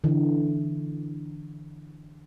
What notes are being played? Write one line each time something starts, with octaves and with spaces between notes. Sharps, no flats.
D3 E3